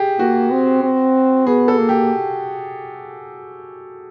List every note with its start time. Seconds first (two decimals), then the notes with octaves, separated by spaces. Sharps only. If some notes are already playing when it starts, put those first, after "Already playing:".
Already playing: G4 G#4
0.19 A#3 F#4
0.51 C4
0.83 C4
1.46 B3 G#4
1.68 A4
1.78 A#3
1.89 G4